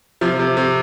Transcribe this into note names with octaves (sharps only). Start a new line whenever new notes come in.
C3 F3
C3
C3